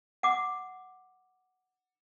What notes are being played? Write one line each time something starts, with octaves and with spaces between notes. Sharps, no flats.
F#5 D6